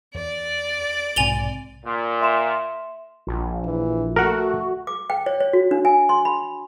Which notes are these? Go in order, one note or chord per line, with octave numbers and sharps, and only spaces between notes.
E2 D5
B1 G#2 C3 G#5 F7 G7
A#2
E5 C6 E7
A#1
E3
A3 F#4 A#4 F#5
D6
G5
C#5
C#5
F#4
D4
G#5
C6
B5